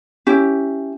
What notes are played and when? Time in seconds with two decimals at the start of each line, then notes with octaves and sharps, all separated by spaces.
0.27 C#4 E4 G4